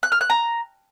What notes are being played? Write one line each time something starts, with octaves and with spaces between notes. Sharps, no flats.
F#6
F6
F#6
A#5